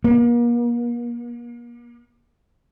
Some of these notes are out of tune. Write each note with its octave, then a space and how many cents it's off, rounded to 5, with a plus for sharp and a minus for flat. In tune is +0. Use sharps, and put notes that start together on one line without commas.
A#3 +40